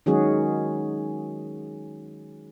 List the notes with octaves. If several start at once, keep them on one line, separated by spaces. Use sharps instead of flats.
D#3 F#3 G#3 C#4 F#4 G#4